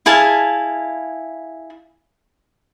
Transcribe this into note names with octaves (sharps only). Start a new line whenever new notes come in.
E4 G#4 F5 A5